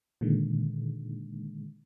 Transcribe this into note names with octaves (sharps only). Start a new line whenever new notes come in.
A#2 D3 D#3 G#3